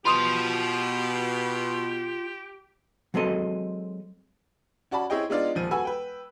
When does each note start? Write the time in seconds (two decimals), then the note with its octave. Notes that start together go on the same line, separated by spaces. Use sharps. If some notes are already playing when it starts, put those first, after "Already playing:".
0.05 B2 F4 G4 A5 B5 C6 D#6
3.14 F#3 G#3 C4 A4 D#5
4.91 C#4 F#4 D5 A5 B5
5.10 C4 E4 G#4 C#5 D#5 G5
5.30 G#3 B3 D4 D#4 F4 D5
5.55 D#1 F3 D#7
5.71 F#4 A4 B4 G#5 B5 E6
5.85 B4 G5